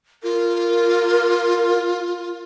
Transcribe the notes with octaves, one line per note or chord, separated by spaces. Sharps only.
F4 A#4